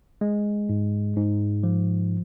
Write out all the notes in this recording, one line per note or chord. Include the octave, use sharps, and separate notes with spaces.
G#3
G#2
G#2
F3